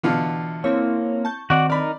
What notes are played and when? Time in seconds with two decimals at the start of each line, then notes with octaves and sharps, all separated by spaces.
0.03 B2 D3 E3 F4
0.64 A#3 C4 E4 C#5
1.25 A5 C#6 G6
1.50 D#3 C4 F#4 D5 F#5
1.70 D#4 A#4 D5 B5